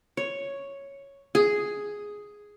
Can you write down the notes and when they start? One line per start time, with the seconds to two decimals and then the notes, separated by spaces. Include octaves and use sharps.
0.17 C#5
1.35 G#4